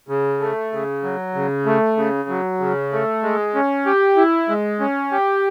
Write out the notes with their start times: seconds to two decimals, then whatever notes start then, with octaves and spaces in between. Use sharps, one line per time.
0.09 C#3
0.40 A3
0.72 C#3
1.03 F#3
1.34 C#3
1.66 A3
1.97 C#3
2.29 F#3
2.60 C#3
2.92 A3
3.23 G#3
3.55 C#4
3.86 G4
4.17 E4
4.49 G#3
4.80 C#4
5.12 G4